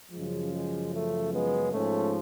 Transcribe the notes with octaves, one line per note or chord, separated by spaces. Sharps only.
F#2 C#3 F3 G#3
G#3
A3
G#3 B3
G#2 F3 A3 C#4